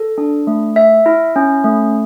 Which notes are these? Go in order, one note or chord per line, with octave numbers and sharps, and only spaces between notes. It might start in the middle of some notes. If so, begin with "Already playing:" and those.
Already playing: A4
D4
A3
E5
E4
C#4
A3